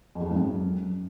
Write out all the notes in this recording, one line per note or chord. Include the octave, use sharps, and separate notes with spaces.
F2
E2
F2
G#2
F#2